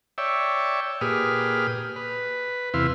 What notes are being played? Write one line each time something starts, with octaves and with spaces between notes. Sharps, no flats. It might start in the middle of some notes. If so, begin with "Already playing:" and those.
C#5 D5 E5 G5
A#2 G4 G#4 B4 D#6 F6
B4
E2 C3 E4 B4 F5 C6